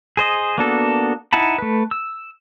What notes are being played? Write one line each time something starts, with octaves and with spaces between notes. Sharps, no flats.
G#4 C5 D#5
A#3 B3 D4 F#4 A4
D#4 E4 F#5 A5 B5
A3 B4
E6